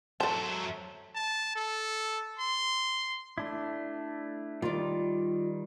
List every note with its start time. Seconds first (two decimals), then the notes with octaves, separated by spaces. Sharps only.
0.20 F#3 A4 C5 E5 A5
1.15 A5
1.56 A4
2.39 C6
3.38 A3 D4 E4
4.62 D#3 G3 F4 D5